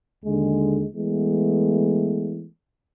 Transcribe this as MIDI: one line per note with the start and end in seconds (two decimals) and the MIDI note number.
0.25 0.84 39
0.25 0.84 50
0.25 0.84 56
0.96 2.46 52
0.96 2.46 56
0.96 2.46 57
0.96 2.46 59